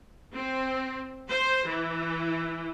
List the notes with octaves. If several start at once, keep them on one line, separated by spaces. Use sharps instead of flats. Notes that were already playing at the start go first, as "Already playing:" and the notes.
C4
C5
E3